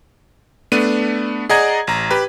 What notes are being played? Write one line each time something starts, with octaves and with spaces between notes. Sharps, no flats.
A3 B3 D4 D#7
G#4 D5 D#5 F#5 A#5 G#6
A1 A#5
G4 B4 B5